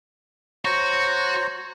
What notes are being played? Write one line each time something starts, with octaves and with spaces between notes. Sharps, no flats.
F#4 C5 C#5 A#5